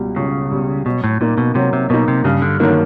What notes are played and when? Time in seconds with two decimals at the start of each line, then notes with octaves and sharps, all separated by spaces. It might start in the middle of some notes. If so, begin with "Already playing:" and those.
Already playing: C#2 B2 G3
0.16 C#2 C#3
0.51 B2 G3
0.86 B2 F#3
1.04 A2
1.21 A#2 A#3 D#4
1.38 B2
1.55 C3 F#3
1.73 C3
1.90 B2 A#3 D#4
2.08 C3
2.24 G2 C#3
2.42 D3
2.60 D3 D#3 F#3 A#3 D#4